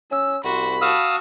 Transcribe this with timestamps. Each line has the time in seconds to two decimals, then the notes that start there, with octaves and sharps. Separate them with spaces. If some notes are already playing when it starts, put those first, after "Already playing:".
0.11 C#4 E6
0.44 C2 F#4 C5 B5
0.82 F#4 F5 A5 D#6 E6